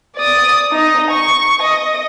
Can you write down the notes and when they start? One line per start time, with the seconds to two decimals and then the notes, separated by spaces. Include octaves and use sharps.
0.16 D5 D#6
0.72 D#4 D#5
1.11 C#6
1.62 D#5